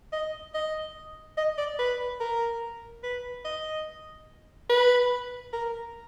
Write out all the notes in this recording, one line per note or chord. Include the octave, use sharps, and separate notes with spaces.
D#5
D#5
D#5
D5
B4
A#4
B4
D#5
B4
A#4